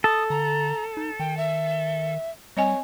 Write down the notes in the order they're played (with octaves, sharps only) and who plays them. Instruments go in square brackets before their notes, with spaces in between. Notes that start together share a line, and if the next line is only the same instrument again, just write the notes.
[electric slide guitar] A4 [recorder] D#6
[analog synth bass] D3 [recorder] A#5
[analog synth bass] D#4
[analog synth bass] D#3 [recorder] G5
[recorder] E5
[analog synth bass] G3 [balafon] C4 D#5 G#5 [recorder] C#5